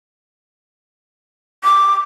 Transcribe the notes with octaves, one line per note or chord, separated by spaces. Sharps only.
D6